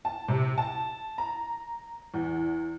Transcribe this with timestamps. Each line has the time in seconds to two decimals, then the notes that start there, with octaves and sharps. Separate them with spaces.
0.05 A5
0.28 C3
0.58 A5
1.18 A#5
2.14 E2